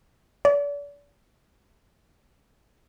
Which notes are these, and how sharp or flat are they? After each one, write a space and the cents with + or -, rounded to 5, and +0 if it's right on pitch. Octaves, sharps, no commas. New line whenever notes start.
D5 -40